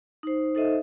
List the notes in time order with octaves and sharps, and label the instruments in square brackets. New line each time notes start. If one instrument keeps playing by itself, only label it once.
[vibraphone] D#4 C5
D#4 A4 C5 D#5 E5